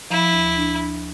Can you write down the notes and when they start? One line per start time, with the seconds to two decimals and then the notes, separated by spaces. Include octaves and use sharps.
0.10 F3 E4
0.33 D2
0.57 D4
0.80 D4